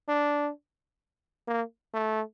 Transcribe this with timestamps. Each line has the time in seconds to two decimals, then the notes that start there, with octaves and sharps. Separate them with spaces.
0.08 D4
1.48 A#3
1.94 A3